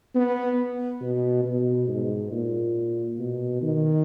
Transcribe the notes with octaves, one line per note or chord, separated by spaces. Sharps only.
B3
B2
B2
G#2
A#2
B2
D#3